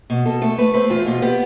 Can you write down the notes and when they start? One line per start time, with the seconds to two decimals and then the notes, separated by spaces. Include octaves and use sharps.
0.10 B2
0.26 B2 A4
0.41 A3 A4
0.58 A3 B4
0.74 C4 B4
0.90 E2 F4
1.06 B2 F4
1.22 B3 G4